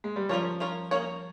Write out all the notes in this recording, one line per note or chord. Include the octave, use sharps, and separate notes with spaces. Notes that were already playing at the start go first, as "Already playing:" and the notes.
G#3
G3
F3 C#4 F4 A#4 C#5
C#4 F4 A#4 C#5
A#3 C#4 G#4 C#5